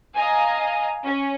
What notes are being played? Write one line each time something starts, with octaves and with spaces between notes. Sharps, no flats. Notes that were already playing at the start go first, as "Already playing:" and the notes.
D#5 F5 G#5 A#5
C#4